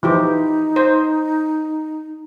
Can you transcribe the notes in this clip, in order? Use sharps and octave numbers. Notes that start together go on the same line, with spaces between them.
E3 F3 D#4 G4
C5